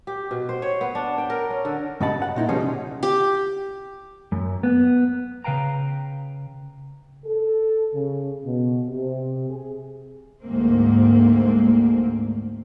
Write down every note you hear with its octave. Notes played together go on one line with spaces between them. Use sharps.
G4
B2
C5
C#5
B3
D4
G5
A#4
C#4
D3
G2 C#3 D#5 F#5 A5 B5
F#5
A#2 D#4 E4
B2 F3 G3 B3 C#4 G#4
C#3
G4
F#2
B3
C#3 B4 F5 G5 A#5
A4
C#3
B2
C3
G#4
D2 G#2 A#3 C4